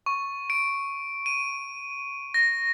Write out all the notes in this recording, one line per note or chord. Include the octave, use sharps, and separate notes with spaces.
C#6
D7
D#7
A#6